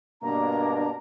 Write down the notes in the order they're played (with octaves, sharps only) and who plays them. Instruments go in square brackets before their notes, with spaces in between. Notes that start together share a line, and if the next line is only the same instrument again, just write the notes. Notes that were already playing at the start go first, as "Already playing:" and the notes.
[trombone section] G2 B2 A#3 [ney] D4 [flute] A#5